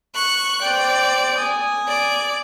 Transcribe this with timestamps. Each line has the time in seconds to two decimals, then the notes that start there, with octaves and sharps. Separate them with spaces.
0.15 C#6 F#6
0.62 C5 D5 G5
1.38 G#5 D#6
1.88 D5